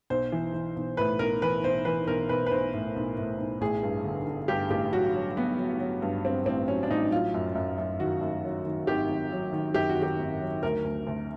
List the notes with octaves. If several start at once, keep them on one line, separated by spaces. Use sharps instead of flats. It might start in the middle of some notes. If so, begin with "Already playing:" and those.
B1 C5
E3
E3
B1
A2 B4
B1 A#4
E3 B4
B1 C5
E3 B4
B1 A#4
B1 B4
B4
B1 C5
A2
B1
A2
B1
A1 G#4
G2
D3
D3
G2 G4
A1 G4
F#3 F#4
F#3
F#3 B3
F#3
F#3
G2
G2 C4
A1 C4
F#3 C#4
D4
A1 D#4
F#3 F4
F#2
F#2
F#2
D#3 F#4
F#2
F#3
D#3
G#1 G4
G#1
F#3
D#3
F#2 G4
F#4
D#3
G4
G#1
F#3
D2 A#4
D2
D2